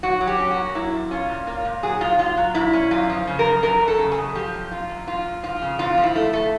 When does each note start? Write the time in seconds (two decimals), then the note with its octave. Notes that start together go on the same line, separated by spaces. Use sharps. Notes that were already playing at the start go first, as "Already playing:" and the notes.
0.03 F#3 F#4
0.21 F#3
0.27 G4
0.38 C#4
0.51 F#4
0.56 A#3
0.75 F#3 E4
0.93 A#2
1.11 C#4 F4
1.29 A#2
1.47 A#3 F4
1.65 A#2
1.83 F#3 G#4
2.01 A#2 F4
2.19 F#3 F4
2.37 F#3
2.55 A#2 E4
2.73 C#4
2.91 F#2 F4
3.09 F3
3.27 C#3
3.39 A#4
3.45 F#2
3.63 F#2 A#4
3.81 F#2
3.88 A4
3.99 C#3
4.12 G#4
4.17 F#2
4.35 F3 G4
4.54 F#2
4.71 F#2 F4
4.89 F#2
5.07 F#2 F4
5.25 F#2
5.43 F3 F4
5.61 C#3
5.79 F2 F4
5.98 F3
6.04 E4
6.15 A3
6.33 A3